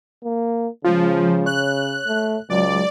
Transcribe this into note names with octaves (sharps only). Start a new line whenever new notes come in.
A#3
C#3 F3 G#3 F4
C#5 F#6
A3
C#2 F#3 G#3 D5